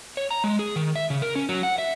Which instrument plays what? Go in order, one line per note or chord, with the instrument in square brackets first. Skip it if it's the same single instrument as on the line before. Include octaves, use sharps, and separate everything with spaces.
[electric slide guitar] C#5
A#5
G#3
G#4
D#3
E5
C#3
A#4
C#4
F#3
F#5
E5